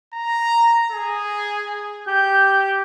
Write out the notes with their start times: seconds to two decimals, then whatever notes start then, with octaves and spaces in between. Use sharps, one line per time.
0.14 A#5
0.91 G#4
2.08 G4 G6